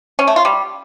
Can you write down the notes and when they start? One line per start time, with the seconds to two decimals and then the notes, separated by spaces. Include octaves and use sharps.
0.19 C#4
0.27 A3
0.36 F4
0.45 G3